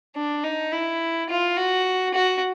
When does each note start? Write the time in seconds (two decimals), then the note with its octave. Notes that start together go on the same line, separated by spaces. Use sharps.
0.16 D4
0.44 D#4
0.72 E4
1.30 F4
1.57 F#4
2.14 F#4